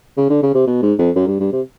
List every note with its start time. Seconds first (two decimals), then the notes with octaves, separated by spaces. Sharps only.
0.17 C#3
0.29 D3
0.42 C#3
0.54 C3
0.66 B2
0.82 G#2
0.98 F2
1.15 F#2
1.27 G2
1.39 G2
1.52 C3